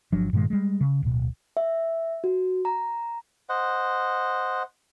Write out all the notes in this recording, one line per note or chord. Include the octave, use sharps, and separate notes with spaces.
G1 F3 F#3 D4
G2 A#2 D#3 G#3
G3 G#3
C#3
D1 B2
E5
F#4
A#5
C5 D#5 F#5